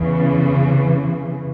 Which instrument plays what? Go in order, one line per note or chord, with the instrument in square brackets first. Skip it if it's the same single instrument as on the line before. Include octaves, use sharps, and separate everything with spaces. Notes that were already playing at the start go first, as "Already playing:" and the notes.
Already playing: [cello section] E2 C#3 E3